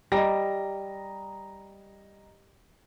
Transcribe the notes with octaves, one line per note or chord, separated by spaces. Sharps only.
G3 D#5 A#5 A#6